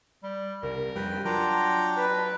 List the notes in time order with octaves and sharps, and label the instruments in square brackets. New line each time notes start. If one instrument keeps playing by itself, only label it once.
[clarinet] G3
[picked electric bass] C2 [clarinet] A#4
[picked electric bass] F2 G3 [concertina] B4 G5
[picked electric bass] F#3 [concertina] D4 G5 A#5 [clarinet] F4
[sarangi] B4 [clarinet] A5